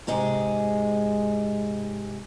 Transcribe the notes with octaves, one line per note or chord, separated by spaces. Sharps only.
G#2 C3 G#3 G#4